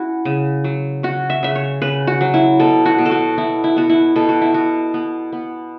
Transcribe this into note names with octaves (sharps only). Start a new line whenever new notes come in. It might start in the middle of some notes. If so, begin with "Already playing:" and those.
Already playing: C#4 E4 F#4
C#3
F#3
C#4 F#4
E5
C#3 E5
C#5
C#3 B4
F#4
F#3
E4
B2 A4
F#4
B2
A4
F#4
B3 E4
E4
B3 F#4
E4
B2 A4
F#4
E4
B2 F#4
B3
B3